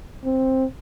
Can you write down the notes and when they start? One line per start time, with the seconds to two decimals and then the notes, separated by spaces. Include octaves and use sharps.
0.25 C4